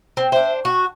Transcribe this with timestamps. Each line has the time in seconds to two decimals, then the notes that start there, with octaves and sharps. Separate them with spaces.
0.17 C4
0.32 D4 C5 E5
0.65 F#4 C#6